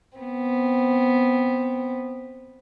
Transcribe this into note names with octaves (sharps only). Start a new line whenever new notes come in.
B3 C4